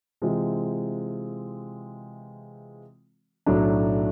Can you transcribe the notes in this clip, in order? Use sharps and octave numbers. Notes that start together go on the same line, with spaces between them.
C3 E3 G#3 C4 F4
B1 A2 F#3 A3 D4